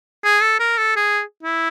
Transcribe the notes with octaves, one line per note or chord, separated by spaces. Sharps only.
G#4
A4
A#4
A4
G#4
E4